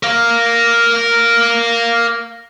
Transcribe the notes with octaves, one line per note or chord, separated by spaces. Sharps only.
A#4 F5